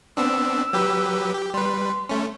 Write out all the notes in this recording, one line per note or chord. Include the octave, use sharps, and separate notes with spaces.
B3 C4 D4 E6
F#3 G4 B4
G4
G3 B4 C6
A3 C#4